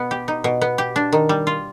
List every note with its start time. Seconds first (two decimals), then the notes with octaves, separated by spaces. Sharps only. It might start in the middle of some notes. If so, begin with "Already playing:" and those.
Already playing: B2 B3
0.11 G4
0.28 D#4
0.44 B2
0.61 B3
0.78 G4
0.96 D4
1.13 D#3
1.29 G3
1.47 F4